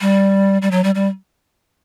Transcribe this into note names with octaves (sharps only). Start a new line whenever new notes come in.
G3
G3
F#3
G3
G3